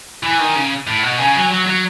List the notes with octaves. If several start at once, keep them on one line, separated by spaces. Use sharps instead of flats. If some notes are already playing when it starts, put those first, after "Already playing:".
E3 G#5
D#3
C#3
A2
B2
C#3 G#5
F#3
F#3
F#3